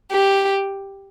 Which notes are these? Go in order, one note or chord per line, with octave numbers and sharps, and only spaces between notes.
G4